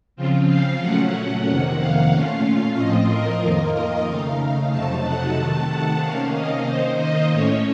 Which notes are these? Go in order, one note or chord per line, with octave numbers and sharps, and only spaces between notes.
C#3 F3 C4 F4
F5
A#2 F#3 A3 C#4 F#5
F#5
F2 C3 D#3 A#3
F5
A#2 A3 C#4 F4 F5
F5
A2 F3 C4 F4 D#5
A#4
F2 D#3 A#3 F4
D#5
C#3 A3 D#4 F5
F2 C3 F#3 A3 D#4 A5
F#5
C3 D#3 A3 A5
F#5
C3 D#3 A#3 C#4 F5
D#5
D#3 A#3 D#4 C5
D#5
A2 A3 C#4 C#5